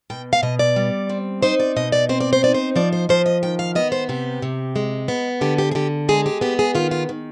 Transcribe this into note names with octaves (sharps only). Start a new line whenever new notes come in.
B2 G5
F5
B2 D#5
D5
G3
C4
D#4 C5
D5
B2 D#5
D5
C4 C5
D5
C5
D#4 D5
C5
F3 D5
C5
F3 C5
D#5
D#3 G5
F5
B3 D#5
C5
C3 G4
C3
G#3
B3
D3 G4
G4
G#4
D3 G4
G#3 G#4
G4
B3 G4
G#4
D#3 F4
F4
D#3